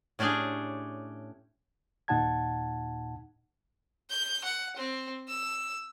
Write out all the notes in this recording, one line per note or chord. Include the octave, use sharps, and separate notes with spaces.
A2 C#4 D4 G4 G#4
D#2 A#2 D#4 F#5 A5 G#6
G6
F#5
C4
E6